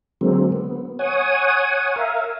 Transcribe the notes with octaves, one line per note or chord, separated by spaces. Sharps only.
D3 F#3 G#3 A#3 C4
B3
C#5 F#5 G#5 D#6
A#4 E5 F5